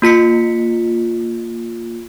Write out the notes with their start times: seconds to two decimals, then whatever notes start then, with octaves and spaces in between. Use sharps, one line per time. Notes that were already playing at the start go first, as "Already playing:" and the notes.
0.02 A#3 F4 B6 C#7